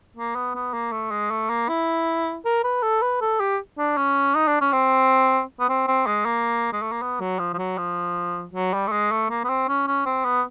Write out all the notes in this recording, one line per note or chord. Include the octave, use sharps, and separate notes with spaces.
A#3
B3
B3
A#3
A3
G#3
A3
A#3
E4
A#4
B4
A4
B4
A4
G4
D4
C#4
D#4
D4
C#4
C4
B3
C4
C4
G#3
A#3
G#3
A3
A#3
B3
F#3
F3
F3
F#3
F3
F#3
G3
A3
G#3
A3
A#3
B3
C4
C#4
C#4
C4
B3